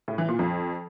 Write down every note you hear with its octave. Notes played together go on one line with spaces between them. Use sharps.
A2
E3
A#2
F2